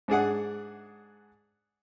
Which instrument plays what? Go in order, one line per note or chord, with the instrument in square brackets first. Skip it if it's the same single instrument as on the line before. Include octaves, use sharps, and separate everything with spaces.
[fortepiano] G#2 D4 G#4 F#5